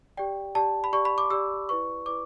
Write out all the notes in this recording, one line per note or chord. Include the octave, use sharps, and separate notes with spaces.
G4 D5 G5
G4 D5 A5
B5
G4 D5 C#6
B5
D6
G4 D5 E6
E4 B4 D5 C#6
E4 B4 D5 D6